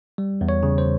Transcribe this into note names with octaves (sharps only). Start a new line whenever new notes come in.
G3
E2
C#5
C#3
C5